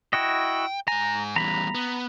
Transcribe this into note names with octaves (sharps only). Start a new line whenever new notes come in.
E4 F#4 D#5 G5
G#2 G#5 A#5
E2 G3 A#5 B5
B3